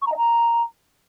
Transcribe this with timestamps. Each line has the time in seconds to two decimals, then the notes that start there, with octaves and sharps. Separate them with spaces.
0.02 C#6
0.07 A#5
0.12 D#5
0.17 A#5